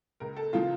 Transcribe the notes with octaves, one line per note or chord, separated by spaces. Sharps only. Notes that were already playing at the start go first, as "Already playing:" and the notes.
C#2 A#4
A4
C#3 F3 F4